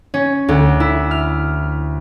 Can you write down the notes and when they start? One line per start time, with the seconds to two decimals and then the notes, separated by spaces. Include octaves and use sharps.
0.14 C#4
0.49 D2
0.80 E4
1.11 F6